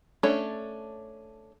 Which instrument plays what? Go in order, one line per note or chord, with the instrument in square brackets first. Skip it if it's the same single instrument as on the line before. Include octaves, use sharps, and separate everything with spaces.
[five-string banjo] A3 C#4 D4 A4 C#5